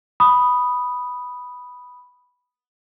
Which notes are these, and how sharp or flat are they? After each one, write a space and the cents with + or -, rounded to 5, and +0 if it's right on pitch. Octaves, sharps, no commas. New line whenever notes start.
B5 +0 D#6 -5